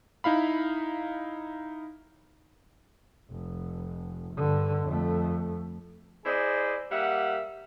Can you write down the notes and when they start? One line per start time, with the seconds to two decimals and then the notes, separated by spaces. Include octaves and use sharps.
0.24 D#4 E4 F5 B5
3.30 F1
4.35 G2 D3
4.86 F2 A3
6.25 E4 G#4 C5 D5 D#5
6.92 G3 A#3 E5 F#5